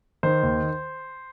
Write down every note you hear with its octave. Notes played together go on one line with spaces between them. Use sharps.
D#3 C5
D#2